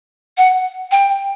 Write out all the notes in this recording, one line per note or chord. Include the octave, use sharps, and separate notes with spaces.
F#5
G5